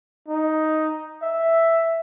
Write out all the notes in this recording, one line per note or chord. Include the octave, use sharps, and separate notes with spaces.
D#4
E5